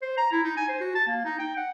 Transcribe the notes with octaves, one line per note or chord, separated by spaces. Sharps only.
C5
A#5
E4
D#4
G#5
C5
F#4
A5
A#3
D#4
G5
F#5